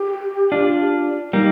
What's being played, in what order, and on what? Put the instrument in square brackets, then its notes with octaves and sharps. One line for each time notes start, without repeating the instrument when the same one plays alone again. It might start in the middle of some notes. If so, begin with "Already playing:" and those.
Already playing: [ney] G4
[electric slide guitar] D4 F4
[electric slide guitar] G3 A#3 [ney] D#4